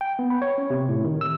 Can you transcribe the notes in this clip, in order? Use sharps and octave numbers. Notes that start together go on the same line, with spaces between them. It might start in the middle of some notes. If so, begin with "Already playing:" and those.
G5
B3
B5
C#5
C#4
C3
A2
D#3
E6